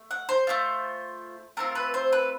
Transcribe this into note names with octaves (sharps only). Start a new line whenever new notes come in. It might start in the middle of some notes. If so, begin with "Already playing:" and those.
Already playing: A3
F#5
C5
A3 D4 F4
A3 C4 F4 A#4
B4
C5
B4